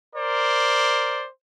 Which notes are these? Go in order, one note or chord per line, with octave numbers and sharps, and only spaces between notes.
A#4 C5 D5